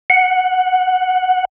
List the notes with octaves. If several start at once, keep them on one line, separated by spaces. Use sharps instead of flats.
F#5